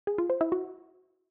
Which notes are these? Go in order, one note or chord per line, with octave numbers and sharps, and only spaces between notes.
G#4
F4
C5
E4
F#4